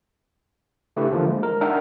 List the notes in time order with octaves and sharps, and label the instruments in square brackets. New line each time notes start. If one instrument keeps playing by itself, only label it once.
[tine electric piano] C#3 A3 D4 E4 G4 B4
D3 E3 F3 A#3
G#3
A#4
D4 D#4 A#4 E5 F#5 G5